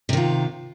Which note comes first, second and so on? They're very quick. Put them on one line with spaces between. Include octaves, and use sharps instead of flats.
C3 D#3 F4